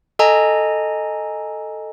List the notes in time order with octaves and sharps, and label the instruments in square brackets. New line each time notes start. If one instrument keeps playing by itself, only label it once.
[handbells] A4 D#5 G#5 A#5